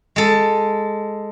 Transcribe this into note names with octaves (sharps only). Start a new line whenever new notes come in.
G#3 A4